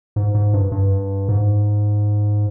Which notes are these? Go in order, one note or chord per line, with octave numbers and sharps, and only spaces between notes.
G#2
G#2
G2
G2
G#2